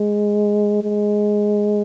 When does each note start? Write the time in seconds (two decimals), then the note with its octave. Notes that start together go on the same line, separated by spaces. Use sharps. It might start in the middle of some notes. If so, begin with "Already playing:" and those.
Already playing: G#3
0.83 G#3